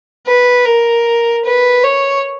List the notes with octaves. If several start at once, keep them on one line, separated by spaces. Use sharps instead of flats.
B4
A#4
B4
C#5